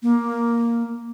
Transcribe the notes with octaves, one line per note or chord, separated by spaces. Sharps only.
A#3